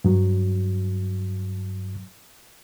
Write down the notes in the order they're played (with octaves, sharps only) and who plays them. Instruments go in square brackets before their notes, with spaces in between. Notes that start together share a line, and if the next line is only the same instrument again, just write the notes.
[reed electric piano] G2 F#3